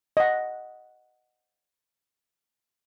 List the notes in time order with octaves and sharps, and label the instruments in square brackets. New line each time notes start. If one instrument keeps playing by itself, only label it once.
[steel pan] D#5 F#5